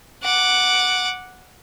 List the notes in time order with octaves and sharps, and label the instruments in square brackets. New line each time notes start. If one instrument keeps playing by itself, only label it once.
[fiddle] F#5 D6